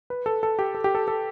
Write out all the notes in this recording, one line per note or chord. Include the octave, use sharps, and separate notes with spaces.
B4
A4
A4
G4
A4
G4
A4
A4